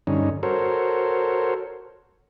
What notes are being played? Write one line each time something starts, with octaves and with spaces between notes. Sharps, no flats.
G2 D3 C#4 D#4
F#4 A4 A#4 C5 C#5